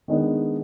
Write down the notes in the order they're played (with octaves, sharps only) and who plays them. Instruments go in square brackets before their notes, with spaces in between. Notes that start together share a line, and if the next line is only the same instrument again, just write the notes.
[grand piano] D#3 G#3 B3 D4